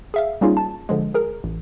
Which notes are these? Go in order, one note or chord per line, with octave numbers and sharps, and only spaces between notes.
G#4 E5 F5
G3 A#3 C#4 D#4 F4 G#4
A5
D3 F3 G#3
G#4 A#4
A1